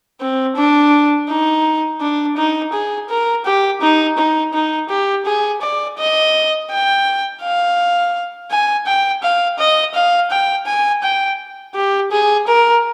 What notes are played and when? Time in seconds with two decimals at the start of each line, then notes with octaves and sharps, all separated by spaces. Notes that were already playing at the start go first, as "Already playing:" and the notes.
0.20 C4
0.56 D4
1.29 D#4
2.01 D4
2.37 D#4
2.73 G#4
3.09 A#4
3.45 G4
3.81 D#4
4.17 D#4
4.53 D#4
4.89 G4
5.26 G#4
5.61 D5
5.98 D#5
6.70 G5
7.42 F5
8.51 G#5
8.86 G5
9.22 F5
9.58 D#5
9.94 F5
10.30 G5
10.66 G#5
11.03 G5
11.74 G4
12.11 G#4
12.47 A#4